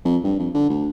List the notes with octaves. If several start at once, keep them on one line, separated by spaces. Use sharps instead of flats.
F2
G2
F2
D3
D2